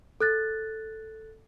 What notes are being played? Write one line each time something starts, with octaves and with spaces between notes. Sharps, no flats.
A4 F#6 A6